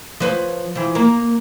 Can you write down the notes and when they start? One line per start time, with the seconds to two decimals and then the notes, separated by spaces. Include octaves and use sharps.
0.20 F3 B4 C#5
0.75 E3 F3
0.95 A#3